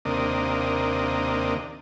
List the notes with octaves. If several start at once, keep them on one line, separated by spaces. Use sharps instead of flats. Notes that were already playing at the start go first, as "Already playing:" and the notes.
D#2 C3 A#3 D4 D#5